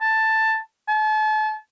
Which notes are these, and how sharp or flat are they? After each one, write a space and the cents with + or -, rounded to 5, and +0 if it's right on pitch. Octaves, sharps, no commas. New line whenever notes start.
A5 +10
A5 -35